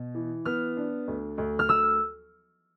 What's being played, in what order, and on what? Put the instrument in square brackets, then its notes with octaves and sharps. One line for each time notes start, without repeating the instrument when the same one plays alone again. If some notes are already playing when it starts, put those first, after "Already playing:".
Already playing: [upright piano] B2
E3
[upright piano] B3 [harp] F6
[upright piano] D4
D2
D2
[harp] F6
[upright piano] D2 [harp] E6